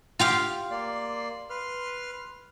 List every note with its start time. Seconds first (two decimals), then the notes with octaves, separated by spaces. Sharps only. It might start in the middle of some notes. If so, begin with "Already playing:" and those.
0.19 F4 G4 F5
0.71 A#3 D5 C6
1.50 B4 C6 F6